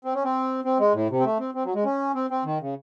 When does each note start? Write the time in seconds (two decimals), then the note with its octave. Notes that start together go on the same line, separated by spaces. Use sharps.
0.05 C4
0.14 C#4
0.24 C4
0.65 C4
0.80 G#3
0.94 A2
1.10 C3
1.20 C4
1.24 A3
1.39 C4
1.55 C4
1.65 F#3
1.75 G#3
1.85 C#4
2.15 C4
2.30 C4
2.45 D#3
2.61 C#3